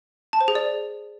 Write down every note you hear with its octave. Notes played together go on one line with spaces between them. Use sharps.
A5
C5
G#4
D5